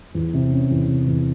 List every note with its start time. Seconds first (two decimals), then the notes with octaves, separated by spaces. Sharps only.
0.15 E2
0.34 C3
0.52 C#4
0.71 E2
0.88 C3
1.07 E2